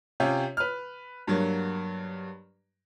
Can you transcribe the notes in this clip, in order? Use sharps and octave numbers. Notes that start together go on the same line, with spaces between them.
C3 C#4 F4 G4
B4 F6
G2 F#3 A#3